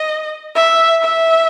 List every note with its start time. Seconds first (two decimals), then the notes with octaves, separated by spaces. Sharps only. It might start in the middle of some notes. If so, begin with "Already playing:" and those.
Already playing: D#5
0.55 E5
1.02 E5